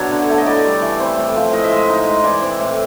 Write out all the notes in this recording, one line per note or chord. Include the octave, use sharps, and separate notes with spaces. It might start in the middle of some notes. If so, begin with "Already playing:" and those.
Already playing: B2 F#3 D4 E4 C#5
D3
A3
D#5
E4 D5
G3
E3
C4
A2
F3
A2 D#5
E5
G#3
D#5
D#4
G#3
E3 D5
C4
A2